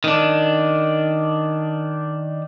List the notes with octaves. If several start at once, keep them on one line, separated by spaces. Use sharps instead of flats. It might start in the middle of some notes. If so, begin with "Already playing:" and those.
D#3 D4